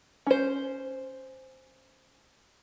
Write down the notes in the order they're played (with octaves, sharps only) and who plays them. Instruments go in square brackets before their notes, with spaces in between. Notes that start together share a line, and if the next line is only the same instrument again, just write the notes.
[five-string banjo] C#4 C5